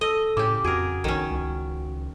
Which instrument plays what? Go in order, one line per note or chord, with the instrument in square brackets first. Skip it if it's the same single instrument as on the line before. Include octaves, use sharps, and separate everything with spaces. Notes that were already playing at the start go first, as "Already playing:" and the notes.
[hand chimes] A4 E6 [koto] D#5
[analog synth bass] A2 [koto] C#3 G4 [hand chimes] D6
[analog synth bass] F2 [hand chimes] F#4 D7 [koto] G#4 A#4
[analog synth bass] B1 [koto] D#3 C#4
[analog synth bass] C#2